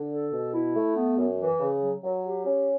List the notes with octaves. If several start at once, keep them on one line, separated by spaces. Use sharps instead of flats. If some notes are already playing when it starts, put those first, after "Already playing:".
Already playing: D3
A4
B2
E4
A3
B3
F#2
E3
C#3
F#3
F#3
G4
C#4